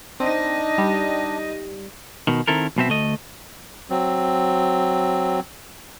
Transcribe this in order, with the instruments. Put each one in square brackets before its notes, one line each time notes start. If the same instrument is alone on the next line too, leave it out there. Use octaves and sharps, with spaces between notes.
[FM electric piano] C4 [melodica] D4 [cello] D#4 D#5
[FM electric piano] G3
[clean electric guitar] B2 D#3
D#3 C4 E4 A4 A#4
B1 B2 C4 E5
D2 A3 D#5
[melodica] F#3 C4